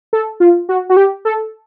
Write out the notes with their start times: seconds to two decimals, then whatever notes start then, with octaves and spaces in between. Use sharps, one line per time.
0.13 A4
0.40 F4
0.69 F#4
0.89 F#4
0.97 G4
1.25 A4